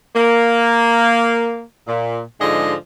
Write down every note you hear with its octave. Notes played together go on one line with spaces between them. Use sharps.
A#3
A#2
G#2 D3 F3 G#3 D#5